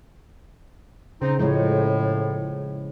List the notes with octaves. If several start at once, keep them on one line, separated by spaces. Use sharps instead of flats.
C#3 C4 D#4
A2 F3 G#3 C#5